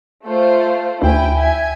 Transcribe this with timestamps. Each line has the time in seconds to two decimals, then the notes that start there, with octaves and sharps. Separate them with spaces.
0.25 A3 F4 C5
1.02 D2 E4 G5 G#5
1.37 E5 G#5 G#6